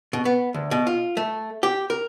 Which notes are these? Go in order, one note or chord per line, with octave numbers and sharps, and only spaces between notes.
B2
B3
D2
B2
F4
A3
G4
A#4